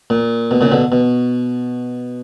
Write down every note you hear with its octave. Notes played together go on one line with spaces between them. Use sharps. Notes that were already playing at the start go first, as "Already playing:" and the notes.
A#2
B2
A#2 C#3
B2 D3
B2